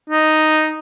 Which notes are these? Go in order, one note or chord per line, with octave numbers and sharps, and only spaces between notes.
D#4